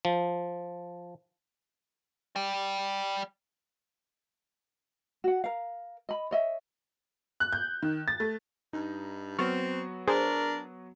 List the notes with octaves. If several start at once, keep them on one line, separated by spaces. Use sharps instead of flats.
F3
D5 G5
F#4 F#5
A#4 F5
D#5 B5
C#5 D#5 E5
F#6
G6
D#3
A6
A3
G2 D#4
F#3 B3 C4 F#4 C#6 F6 A6
D4 G#4 A#4 C5